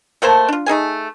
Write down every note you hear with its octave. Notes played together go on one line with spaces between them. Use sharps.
A3 A#3 C5 A5
D4 F4
A3 D#4 G#4 G#5